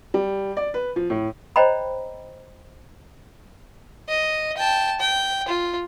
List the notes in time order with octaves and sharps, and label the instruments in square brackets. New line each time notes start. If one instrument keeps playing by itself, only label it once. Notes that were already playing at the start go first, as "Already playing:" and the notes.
[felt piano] G3
D5
B4
F3
A2
[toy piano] C5 C#5 D#5 G5 A#5 B5
[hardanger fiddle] D#5
G5 A5
G5
F4